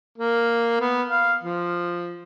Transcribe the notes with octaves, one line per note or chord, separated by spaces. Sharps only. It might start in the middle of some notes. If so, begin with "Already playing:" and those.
A#3
B3
F5
F3